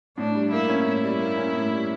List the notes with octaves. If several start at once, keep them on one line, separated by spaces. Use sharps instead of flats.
A2 D4
G3
A#3 E4
C#4
A2 E4
G3
A#3
C#4
A2
G3